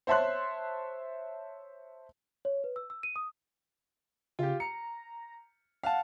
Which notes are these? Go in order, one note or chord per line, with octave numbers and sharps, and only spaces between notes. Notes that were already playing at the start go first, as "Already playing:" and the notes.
C5 C#5 E5 A5 C6 F#6
C#5
B4
E6
E6
D#7
D#6
C#3 F4 G4
A#5 C#7
F5 F#5 A5